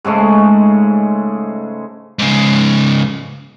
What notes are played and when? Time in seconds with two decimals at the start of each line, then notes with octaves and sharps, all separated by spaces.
0.05 G#2 C#3 G#3 A3
2.19 G#2 C#3